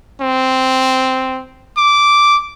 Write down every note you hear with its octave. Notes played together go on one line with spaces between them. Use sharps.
C4
D6